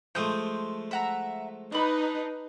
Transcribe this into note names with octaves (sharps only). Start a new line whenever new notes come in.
F3 G#3 A3 C6 D#6 G6
E5 F#5 A#5
D4 D#4 B4 B5